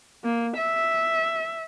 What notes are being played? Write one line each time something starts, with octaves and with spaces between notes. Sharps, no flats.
A#3
E5